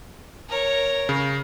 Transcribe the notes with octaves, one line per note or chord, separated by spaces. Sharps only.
A#4 C#5
C#3